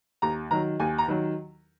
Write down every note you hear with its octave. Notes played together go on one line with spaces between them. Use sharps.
D#2 A#5
D#3 F#3 A#5
D#2 G#5
A#5
D#3 F#3